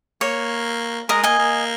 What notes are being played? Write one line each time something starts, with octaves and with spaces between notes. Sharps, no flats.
A#3 C#5
G#3 A#4 D#5
A#3 D#5 G#5
A#3